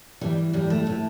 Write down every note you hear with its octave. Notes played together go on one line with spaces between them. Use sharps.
E3 G3
A2 G3
A3
E3 A3